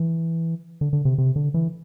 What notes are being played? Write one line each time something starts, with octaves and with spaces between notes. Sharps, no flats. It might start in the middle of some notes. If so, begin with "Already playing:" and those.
Already playing: E3
D3
D3
C3
C3
D3
E3